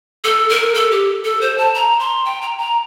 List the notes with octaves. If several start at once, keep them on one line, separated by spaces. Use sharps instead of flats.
A4
A#4
A4
G4
A4
C5
A5
A#5
C6
G5
A#5
A#5